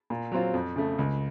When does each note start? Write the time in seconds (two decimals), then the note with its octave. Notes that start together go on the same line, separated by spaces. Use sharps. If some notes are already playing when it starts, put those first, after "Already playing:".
0.10 A#2
0.32 F#3 C4 F4
0.54 F2
0.76 C#3 A3
0.98 C#2